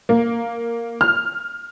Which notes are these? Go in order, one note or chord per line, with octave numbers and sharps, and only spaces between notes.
A#3
F6